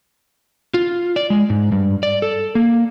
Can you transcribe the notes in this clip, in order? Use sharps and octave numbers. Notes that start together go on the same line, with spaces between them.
F4
D5
G#3
G#2
G2
D5
A4
A#3